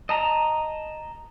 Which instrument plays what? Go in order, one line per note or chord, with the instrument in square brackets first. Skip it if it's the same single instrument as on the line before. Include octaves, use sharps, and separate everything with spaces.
[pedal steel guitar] D#5 A5 A#5